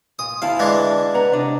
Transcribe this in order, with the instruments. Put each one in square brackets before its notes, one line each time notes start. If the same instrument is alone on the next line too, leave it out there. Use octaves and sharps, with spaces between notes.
[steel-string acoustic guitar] A#2 [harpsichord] D#6
[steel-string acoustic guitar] D2 E4 A5 [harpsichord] F5
[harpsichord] E3 G#3 D4
[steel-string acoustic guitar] A5
B4 F#5 A#5
C3 D4 D#5